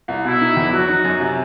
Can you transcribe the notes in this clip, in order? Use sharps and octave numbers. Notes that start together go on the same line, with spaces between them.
C2
B2 E4
D#4
E2
F#3 F#4
D#4
F#2
C3